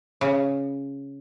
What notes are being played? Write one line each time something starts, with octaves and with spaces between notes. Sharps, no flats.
C#3